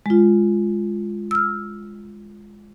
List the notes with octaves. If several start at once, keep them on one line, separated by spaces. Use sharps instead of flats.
G#3 F4
E6 F6